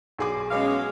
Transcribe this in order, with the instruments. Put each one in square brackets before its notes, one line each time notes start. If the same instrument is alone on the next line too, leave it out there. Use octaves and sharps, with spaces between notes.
[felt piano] B1 G#4 D6
[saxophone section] B2 F5 [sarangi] G#3 [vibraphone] C#4 C#5